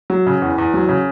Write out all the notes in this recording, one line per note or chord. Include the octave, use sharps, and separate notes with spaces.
F#3
C#3
E2
E2
F#3
C#3